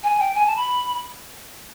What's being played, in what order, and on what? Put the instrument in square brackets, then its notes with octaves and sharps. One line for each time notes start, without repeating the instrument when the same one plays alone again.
[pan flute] G#5
G5
G#5
A5
B5